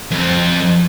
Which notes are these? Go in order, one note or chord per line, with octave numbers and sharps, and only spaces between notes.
F2 C4